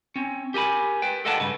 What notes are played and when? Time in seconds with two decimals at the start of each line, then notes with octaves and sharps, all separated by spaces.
0.16 C4 C#4
0.54 G4 A#4 G#5 B5
1.02 B4 G5
1.25 A4 A#4 D#5 F#5 G5 A5
1.40 G2 C#3 B4